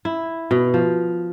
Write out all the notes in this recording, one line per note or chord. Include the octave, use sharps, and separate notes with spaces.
E4
B2
F3